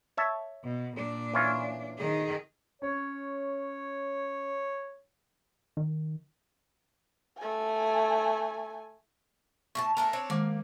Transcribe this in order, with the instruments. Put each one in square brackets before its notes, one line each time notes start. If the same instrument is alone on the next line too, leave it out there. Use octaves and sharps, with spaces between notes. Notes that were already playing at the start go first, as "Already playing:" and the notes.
[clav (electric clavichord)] C#5 E5 A5
[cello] B2
A#2 D4
[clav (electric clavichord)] E3 C#4 F4
[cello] D#3 G#4
[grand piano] C#4 [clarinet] C#5
[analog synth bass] D#3
[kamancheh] A3 G#5
[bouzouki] A2 F4 A5 [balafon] C#6
[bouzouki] A3 D4 A#4 [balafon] G#5 A5
[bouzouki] C4 D4 C#5
[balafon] D#3 G#3 D6 [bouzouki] A#3